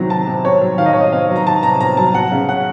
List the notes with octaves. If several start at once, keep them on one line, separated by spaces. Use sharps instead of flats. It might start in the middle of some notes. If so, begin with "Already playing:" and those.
Already playing: C3 D#3 F#3 C4 A#5
D#3 A5
C3
C4 C#5
F#3
D#3 F5
D#5
C3 C#5
D#5
C4 F5
F#3
A#5
D#3 A5
C3 A#5
C4 A#5
F#3 A5
F#3 F#5
C#3
C#4 F#5